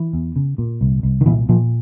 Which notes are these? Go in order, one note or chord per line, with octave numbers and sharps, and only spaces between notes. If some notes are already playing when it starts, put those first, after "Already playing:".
Already playing: E3
E2
C#3
A#2
C2
C2
D#3
A#2 E3
A#2 F3